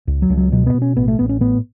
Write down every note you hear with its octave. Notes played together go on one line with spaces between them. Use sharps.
C#2
F#3
C#2
F#3
B2 F#3
B3
B2
C#4
A1 B3
A3
A1 B3
C#4
A2 B3